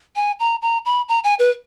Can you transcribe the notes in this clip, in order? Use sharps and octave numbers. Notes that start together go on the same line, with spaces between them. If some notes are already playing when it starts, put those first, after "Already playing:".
G#5
A#5
A#5
B5
A#5
G#5
B4